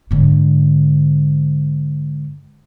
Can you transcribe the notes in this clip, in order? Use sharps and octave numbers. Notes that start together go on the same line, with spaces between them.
G#2 D3